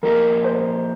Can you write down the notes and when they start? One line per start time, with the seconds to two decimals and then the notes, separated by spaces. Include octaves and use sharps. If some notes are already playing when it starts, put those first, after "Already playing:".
0.03 F3 A#3 G4 A#4 D#5
0.44 C5